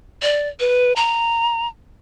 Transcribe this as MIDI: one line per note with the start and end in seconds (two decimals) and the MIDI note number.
0.22 0.48 74
0.60 0.93 71
0.96 1.68 82